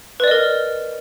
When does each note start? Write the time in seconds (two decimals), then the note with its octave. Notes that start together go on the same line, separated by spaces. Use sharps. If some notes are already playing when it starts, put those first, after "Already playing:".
0.20 B4
0.24 D5
0.27 D#5
0.31 A#4